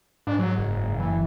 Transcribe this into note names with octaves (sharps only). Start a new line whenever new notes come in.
G#2 D4
F#3
F#1
E3